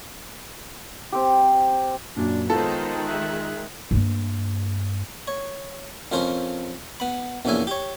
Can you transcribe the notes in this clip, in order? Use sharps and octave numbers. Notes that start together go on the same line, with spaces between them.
C4 G4
F#2 A#2 D4
D#3 G#3 B3 F4 A4 C5
E5 F#6
G2 A#3
C#5
F2 F3 C#4 A#4 C5
B3 B5
A#1 E2 A#2 C#4 E5 G#5
G4 C#5